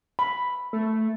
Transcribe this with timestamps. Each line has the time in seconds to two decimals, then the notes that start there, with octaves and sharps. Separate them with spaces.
0.19 B5
0.73 A3